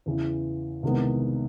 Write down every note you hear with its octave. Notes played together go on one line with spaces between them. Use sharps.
E2 C#3 E3
C2 C3 D#3 G#3 B3